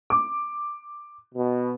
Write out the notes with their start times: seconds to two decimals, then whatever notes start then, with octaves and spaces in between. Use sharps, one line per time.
0.10 D6
1.35 B2